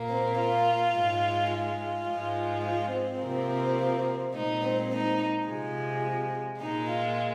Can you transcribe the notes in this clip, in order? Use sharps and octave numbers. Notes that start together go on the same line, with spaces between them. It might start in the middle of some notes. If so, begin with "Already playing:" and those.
Already playing: A#2 A#3
C4
F4
G#2 G#3
F4
G#2 F3 G#3
F4
C4
C3 F3 A#3
A#2 G#3 D#4
C4
D#4
C3 F3 G#3
A#2 G#3 D#4
F4